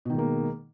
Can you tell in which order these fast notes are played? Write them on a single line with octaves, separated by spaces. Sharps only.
B2 D#3 G#3 A#3